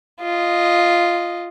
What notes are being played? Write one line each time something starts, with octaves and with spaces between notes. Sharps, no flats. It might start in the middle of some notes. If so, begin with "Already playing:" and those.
F4 D#5